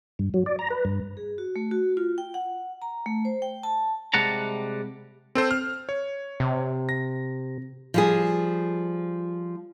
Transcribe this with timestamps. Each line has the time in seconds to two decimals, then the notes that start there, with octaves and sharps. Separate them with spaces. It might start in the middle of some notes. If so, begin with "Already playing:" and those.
0.19 G2
0.34 F#3
0.46 D5
0.59 A#5
0.70 B4
0.85 G2
1.17 G#4
1.38 F#4
1.56 A3
1.71 F#4
1.97 F4
2.18 G5
2.34 F#5
2.82 A#5
3.06 A3
3.25 C5
3.42 G5
3.63 A5
4.14 C3 G3 G#3 F#5 A5 A#5
5.35 C4 A4 C5
5.51 F6
5.89 C#5
6.40 C3
6.89 A#6
7.94 F3 G3 G#4